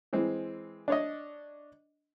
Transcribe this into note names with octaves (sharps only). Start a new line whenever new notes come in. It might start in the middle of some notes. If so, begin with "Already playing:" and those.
E3 G#3 C4
D4 C#5 D#5